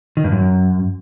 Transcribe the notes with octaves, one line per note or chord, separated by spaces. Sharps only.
D#3
G2
F#2